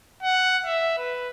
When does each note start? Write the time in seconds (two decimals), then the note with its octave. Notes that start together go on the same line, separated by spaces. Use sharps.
0.23 F#5
0.66 E5
0.98 B4